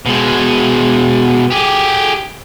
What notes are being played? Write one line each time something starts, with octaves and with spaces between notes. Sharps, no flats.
B2 G#3
G4 G#4